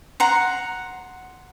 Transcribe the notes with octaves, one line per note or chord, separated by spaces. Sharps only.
F#5 A#5 C6